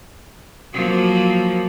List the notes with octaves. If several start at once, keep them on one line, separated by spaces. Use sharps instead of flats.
F3 F#3 A#3